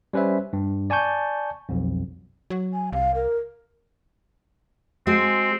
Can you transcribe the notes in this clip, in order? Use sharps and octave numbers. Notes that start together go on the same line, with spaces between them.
G3 C#4 B4 C5 E5
G2
D5 G#5 A5 C#6 G6
B1 F2
F#3
G#5
C2 F5
A#4
G#3 C4 F#4 G#4